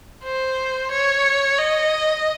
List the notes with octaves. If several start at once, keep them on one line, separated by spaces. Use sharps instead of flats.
C5
C#5
D#5